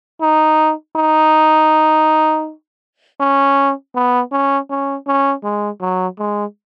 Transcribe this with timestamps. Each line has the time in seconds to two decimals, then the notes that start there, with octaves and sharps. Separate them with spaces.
0.21 D#4
0.96 D#4
3.20 C#4
3.95 B3
4.32 C#4
4.70 C#4
5.07 C#4
5.44 G#3
5.81 F#3
6.19 G#3